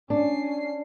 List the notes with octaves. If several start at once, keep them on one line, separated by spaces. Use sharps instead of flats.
C#4 D4 C7